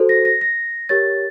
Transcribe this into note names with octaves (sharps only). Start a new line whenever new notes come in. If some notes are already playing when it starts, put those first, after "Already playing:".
Already playing: F#4 A4 C5
A#6
A#6
A#6
G4 A#4 C#5 A6